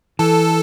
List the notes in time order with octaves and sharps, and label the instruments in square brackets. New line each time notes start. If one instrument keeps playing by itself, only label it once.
[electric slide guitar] E3 [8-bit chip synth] A4